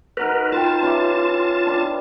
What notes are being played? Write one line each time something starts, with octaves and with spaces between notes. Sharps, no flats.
D#4 F#4 A#4 B4 C#5
F4 B4 C#5 G5 A5
C#4 E4 G4
D4 B4